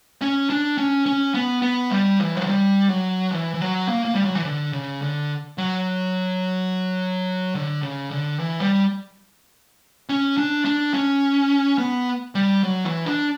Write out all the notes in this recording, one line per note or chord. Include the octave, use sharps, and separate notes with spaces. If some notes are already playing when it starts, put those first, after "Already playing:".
C#4
D4
C#4
C#4
B3
B3
G3
E3
F#3
G3
F#3
E3
E3
F#3
A#3
A#3
G3
F#3
E3
D3
C#3
D3
F#3
D3
C#3
D3
E3
G3
C#4
D4
D4
C#4
B3
G3
F#3
E3
D4